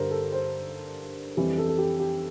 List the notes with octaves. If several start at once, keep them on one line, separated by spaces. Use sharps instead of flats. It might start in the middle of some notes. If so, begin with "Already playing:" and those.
Already playing: G2 D3 G3 A#4 C5
A4
C5
F2 E3 G3
A4
A4
G4
G4